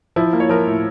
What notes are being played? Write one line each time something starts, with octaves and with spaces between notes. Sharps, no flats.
F3 E4
A#3
C#5
F3 A#4
A2